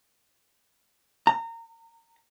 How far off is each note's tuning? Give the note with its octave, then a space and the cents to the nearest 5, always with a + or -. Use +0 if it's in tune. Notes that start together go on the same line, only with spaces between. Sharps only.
A#5 -25